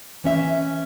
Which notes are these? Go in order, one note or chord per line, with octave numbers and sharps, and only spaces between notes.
E3 C#4 E5